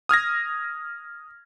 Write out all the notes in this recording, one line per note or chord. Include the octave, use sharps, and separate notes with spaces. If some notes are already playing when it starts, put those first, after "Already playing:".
D#6 F6 G#6 A#6